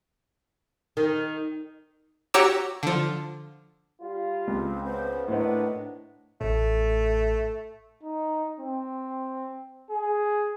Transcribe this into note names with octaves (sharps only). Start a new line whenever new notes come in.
D#3
F#4 G4 C#5 A#5 D6 E6
D3 F3
G3 F4
C#2 C4
C#3 B3 C5
A2 D#3 A#3 B3 D4 C5 D#5
A1 A2 A3
D#4
C4
G#4